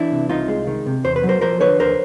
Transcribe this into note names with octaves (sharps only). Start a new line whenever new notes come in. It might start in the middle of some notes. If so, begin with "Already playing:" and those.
Already playing: E3 D4 E4
C3
C2 D#4 F4
G#3
D#3
C3
E2 C5
B4
F#3
A#4 C5
F3 A#4 C5
D3 B4 C#5
D#2 A#4 C5